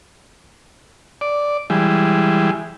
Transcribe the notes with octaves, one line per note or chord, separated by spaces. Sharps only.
D5
E3 G3 G#3